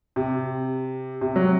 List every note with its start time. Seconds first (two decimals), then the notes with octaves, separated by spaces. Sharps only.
0.16 C3
1.21 C3
1.36 F#3